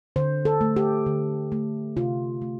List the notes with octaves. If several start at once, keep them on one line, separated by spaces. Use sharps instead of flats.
D3 C5
A4
A3
G4
D3
A3
C3 F4
A3